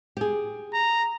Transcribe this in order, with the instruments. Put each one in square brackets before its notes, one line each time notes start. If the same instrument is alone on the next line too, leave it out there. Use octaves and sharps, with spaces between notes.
[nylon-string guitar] G4 G#4
[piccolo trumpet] A#5